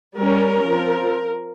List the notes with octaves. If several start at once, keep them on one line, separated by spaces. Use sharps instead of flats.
G3 C#4 A#4
F3 C4